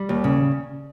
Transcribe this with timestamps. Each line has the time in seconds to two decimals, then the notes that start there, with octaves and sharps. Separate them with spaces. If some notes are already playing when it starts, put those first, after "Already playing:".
Already playing: G3
0.09 D#2
0.24 C#3